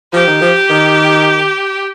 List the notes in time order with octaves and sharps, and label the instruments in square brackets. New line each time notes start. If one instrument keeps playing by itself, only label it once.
[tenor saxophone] F3 [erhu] G4
[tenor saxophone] D#3
F3
D#3